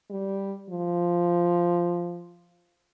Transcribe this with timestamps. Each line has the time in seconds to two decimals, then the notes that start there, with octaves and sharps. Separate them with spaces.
0.10 G3
0.69 F3